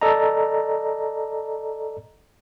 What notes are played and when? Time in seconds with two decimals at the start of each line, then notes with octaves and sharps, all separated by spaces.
0.01 A4 D5 D#5 A#5